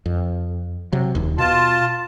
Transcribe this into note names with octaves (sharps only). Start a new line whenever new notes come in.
F2
C3 F#3
D#1 D#2
B2 F4 A5